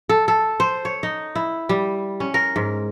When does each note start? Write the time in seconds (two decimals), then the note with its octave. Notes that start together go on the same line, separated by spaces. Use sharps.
0.09 A4
0.28 A4
0.60 C5
0.85 C#5
1.03 D#4
1.35 E4
1.69 G3
2.20 C#4
2.34 A#4
2.56 G#2